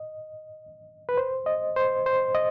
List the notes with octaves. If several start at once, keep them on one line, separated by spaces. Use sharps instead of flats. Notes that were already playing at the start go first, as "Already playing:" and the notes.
Already playing: D#5
B4
C5
D#5
C5
C5
D#5